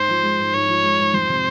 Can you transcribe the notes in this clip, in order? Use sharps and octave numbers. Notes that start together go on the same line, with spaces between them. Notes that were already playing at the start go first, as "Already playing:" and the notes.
Already playing: G#2 C5
F3
G#3
G#2
G#2 C#5
F3
G#3
G#2
F2 C5
C3